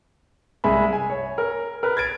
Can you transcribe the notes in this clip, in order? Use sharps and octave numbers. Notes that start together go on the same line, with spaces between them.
C2 G#3 E5 G#5 B5
G#5
C#5
A#4
A#4 B4
G#6 A6 D7